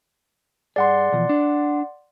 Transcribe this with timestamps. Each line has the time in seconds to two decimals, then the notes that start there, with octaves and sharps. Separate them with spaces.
0.76 G2 G#4 D5 F#5 C6
1.12 B2 E3 F3
1.29 D4